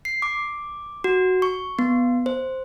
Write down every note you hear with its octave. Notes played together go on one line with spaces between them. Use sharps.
C7
D6
F#4
C#6
B3
C5